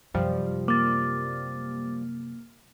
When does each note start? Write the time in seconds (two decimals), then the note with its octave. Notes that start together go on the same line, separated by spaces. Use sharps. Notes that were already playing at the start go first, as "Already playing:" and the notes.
0.14 F#2 C3 F3 G3
0.68 A#3 D6 A6